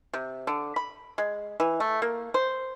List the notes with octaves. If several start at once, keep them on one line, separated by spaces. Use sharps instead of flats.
C3
D3
B5
G#3
E3
A3
A#3
C5